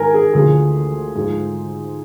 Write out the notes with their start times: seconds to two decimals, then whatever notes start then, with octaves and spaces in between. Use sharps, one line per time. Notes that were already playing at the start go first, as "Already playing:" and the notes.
Already playing: G#2 D#3 A#4 G#5
0.14 G#4
0.34 D2 D3 F3 G#4
1.15 G#2 F3